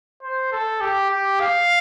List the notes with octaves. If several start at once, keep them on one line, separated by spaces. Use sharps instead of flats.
C5
A4
G4
G4
F5